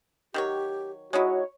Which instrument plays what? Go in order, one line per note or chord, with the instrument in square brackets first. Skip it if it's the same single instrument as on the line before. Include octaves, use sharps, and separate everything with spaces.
[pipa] D#3 F#3 C#5 [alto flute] G4
[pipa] G#3 D#4 E4 [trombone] F#4 [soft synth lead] C#5 [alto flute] D#5